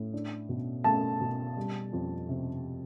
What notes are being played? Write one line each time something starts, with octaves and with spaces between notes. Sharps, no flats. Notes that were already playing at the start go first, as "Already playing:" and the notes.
Already playing: A2
D4
B2
A3 A5
B2
G3
F2
C3